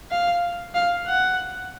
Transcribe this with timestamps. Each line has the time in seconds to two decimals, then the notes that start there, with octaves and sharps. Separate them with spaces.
0.11 F5
0.75 F5
1.07 F#5